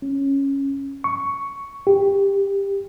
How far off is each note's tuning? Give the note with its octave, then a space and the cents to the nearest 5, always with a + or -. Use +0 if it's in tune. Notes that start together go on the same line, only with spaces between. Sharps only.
C#4 -10
C#6 +5
G4 +15